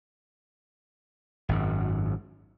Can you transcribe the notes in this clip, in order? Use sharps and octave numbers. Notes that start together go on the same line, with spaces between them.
G#1 F#2